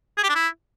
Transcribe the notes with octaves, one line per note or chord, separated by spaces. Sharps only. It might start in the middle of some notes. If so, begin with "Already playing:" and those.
G#4
G4
D4
E4